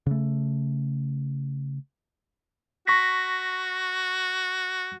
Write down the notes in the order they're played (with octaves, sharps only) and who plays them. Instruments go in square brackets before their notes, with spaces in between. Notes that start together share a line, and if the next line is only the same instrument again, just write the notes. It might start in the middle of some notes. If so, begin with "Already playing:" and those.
[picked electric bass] C#3 A3
[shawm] F#4 [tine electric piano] C#6 A#6 B6